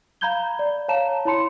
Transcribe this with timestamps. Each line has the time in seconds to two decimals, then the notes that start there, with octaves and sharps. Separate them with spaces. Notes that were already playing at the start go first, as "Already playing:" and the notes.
0.21 F5 A#5 B5 G6 G#6 G7
0.59 D5
0.88 C#5 F5 A5 A#5 E7
1.25 E4 C#5 A5 B5 C6 C#7